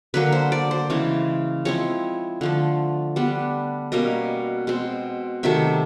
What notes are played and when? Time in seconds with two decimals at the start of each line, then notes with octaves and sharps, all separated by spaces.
0.14 D3 F#3 A#3 B4
0.32 C5
0.52 D5
0.71 C5
0.90 C#3 E3 G#3 C#4
1.65 F3 G#3 C4 E4 C#5
2.41 D3 F3 A3
3.16 G3 B3 D4
3.92 B2 G3 A#3 C#4 D#5
4.67 B2 G#3 C4
5.43 C3 D#3 F#3 A3 E5